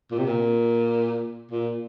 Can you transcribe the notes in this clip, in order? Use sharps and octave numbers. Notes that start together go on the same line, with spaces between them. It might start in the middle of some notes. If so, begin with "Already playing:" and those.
A#2
C3
A#2
A#2